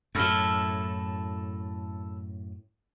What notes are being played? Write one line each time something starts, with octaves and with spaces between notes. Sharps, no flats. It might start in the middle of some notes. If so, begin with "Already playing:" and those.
F#2 A2 E4 A4 F6